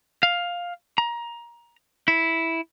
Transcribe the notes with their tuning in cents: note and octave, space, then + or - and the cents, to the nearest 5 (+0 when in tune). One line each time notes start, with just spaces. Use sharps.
F5 +10
A#5 +20
E4 -5